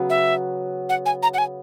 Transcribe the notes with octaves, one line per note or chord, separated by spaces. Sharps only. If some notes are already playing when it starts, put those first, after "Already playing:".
Already playing: C#3 F#3 B3
E5
F#5
G#5
A#5
F#5
G#5